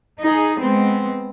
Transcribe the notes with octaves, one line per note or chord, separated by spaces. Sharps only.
D#4 G#4
G#3 B3 C4